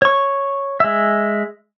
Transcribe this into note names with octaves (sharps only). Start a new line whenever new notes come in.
C#5 C#6
G#3 E5